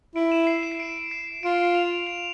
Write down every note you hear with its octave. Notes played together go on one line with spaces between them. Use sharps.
E4 D7
E7
C7
E7
C7
D7
C7
F4 D7
F7
F7